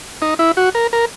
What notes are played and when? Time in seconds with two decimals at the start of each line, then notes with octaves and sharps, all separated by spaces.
0.22 D#4
0.39 E4
0.57 F#4
0.75 A#4
0.93 A#4